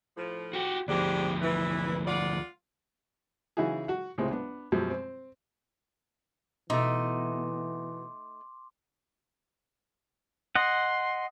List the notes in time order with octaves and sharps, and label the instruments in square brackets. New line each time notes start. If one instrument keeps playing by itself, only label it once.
[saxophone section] A2 F3
[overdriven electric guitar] F#4 G4
[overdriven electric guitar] D2 F3 [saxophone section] G#2 D4 G4
[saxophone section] E3
F4 D5 F#5
[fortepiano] C#3 E3 D#4 E4 F#4 G#4
F#4 F#5
C#2 A2 C3 G#3 C4
B3 D4
F#2 B2 F3 G3 G#3
C4
[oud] B2 [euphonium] E3 [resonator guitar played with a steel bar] A3 D#4 [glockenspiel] C6 D6
[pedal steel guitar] D#5 F#5 [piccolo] C6